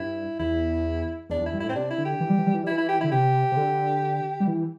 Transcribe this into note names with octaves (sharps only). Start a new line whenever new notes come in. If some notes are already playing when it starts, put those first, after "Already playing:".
Already playing: G2 E4
E2 E4
E2 D4
E2
E4
G2
A2 E4
C4
C3 D4
E4
D3
G4
E3
G3
E3
G3
E3
G3 E4
E3
E4
G4
D3 E4
C3 G4
C3
D3
G3
E3